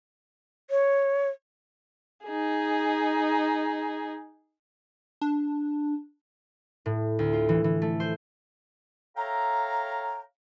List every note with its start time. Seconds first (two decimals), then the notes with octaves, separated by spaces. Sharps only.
0.70 C#5
2.25 D#4 G#4
5.21 D4
6.86 A2
7.19 D2
7.33 F4
7.49 E3
7.64 E3
7.82 A3
8.00 C5
9.17 A4 C#5 E5 F5 G5 A#5